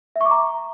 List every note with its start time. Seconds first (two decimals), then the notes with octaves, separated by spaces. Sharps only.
0.16 E5
0.21 C#6
0.26 D6
0.31 A#5